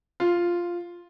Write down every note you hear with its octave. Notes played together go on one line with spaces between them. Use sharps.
F4